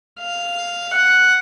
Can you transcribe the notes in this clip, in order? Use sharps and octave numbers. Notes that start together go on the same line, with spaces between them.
F5
F#5